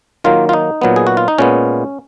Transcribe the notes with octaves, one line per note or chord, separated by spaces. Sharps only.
D#3 F#3 A#3 F4
F4
D#4
A#2 F#3 B3
G#4
F#4
F4
D#4
A#2 G#3 B3 C#4